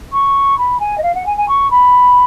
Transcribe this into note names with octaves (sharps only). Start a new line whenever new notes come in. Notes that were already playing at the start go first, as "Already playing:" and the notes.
C#6
B5
G#5
D#5
F5
F#5
G#5
G#5
C#6
B5